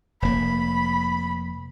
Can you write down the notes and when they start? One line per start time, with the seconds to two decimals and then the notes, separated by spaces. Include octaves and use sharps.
0.22 F1 A#3 B5